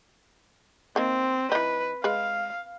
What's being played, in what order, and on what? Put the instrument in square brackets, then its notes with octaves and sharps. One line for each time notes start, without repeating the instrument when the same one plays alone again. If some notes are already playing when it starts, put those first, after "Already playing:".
[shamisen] D#3 A#3 [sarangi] C4
[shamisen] E3 D#4 [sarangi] B4
[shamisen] G#3 B4 [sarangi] F5